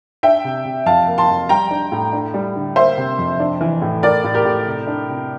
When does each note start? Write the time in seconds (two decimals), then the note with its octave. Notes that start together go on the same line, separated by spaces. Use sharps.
0.23 D4 E5 G5
0.44 C3
0.65 C3
0.86 F2 F5 A5
1.08 A#3
1.18 A5 C6
1.29 F2
1.49 G3 G5 A#5
1.71 D4
1.92 A2
2.13 D4
2.34 G3
2.55 D3
2.76 A#3 C5 E5
2.97 C3
3.19 F2
3.40 D4
3.61 E3
3.82 A2
4.03 A2 A#4 D5
4.24 A2
4.34 G4 A#4
4.45 A2
4.66 C3
4.87 D4
5.08 C3